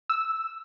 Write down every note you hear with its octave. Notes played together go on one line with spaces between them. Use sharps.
E6